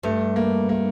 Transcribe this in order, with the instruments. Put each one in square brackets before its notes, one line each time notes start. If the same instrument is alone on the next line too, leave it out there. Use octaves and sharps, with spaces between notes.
[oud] G2 [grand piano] A3
[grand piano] A#3
A#3